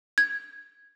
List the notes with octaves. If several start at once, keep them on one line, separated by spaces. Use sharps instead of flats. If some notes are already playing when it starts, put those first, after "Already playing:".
G#6